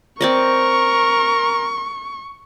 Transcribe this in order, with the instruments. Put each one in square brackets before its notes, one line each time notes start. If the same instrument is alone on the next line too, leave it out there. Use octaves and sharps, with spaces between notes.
[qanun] C4 D5 D#5 [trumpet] A#4 [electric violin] C#6